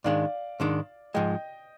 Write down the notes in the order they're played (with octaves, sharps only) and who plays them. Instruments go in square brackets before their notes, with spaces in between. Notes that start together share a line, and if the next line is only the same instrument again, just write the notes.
[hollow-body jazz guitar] G#2 D#3 G#3 D4 [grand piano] D5 F5
[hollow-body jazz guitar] G#2 D#3 G#3 D4
[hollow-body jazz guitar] G#2 F3 G#3 [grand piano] D#5 G5